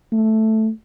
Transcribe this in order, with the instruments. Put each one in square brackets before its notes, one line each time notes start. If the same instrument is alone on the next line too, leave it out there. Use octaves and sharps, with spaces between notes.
[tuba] A3